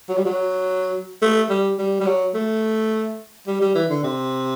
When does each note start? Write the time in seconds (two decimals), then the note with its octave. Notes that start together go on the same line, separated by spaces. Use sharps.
0.09 F#3
0.17 G3
0.25 F#3
1.22 A3
1.50 G3
1.79 G3
2.00 G3
2.06 F#3
2.35 A3
3.47 G3
3.61 G3
3.75 E3
3.90 D3
4.04 C3